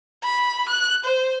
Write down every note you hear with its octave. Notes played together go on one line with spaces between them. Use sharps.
B5
F#6
C5